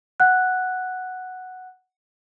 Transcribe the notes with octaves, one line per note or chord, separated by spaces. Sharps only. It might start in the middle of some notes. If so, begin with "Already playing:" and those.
F#5 F#6